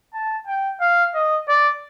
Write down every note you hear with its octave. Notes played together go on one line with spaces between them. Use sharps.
A5
G5
F5
D#5
D5